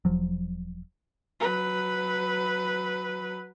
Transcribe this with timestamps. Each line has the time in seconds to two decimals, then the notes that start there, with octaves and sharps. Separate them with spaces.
0.05 E1 F3 F#3
1.40 F#3 B4